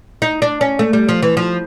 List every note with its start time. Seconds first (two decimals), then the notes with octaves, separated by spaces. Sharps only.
0.22 D#4
0.42 D4
0.61 C#4
0.79 A3
0.93 G3
1.09 F3
1.23 E3
1.37 F3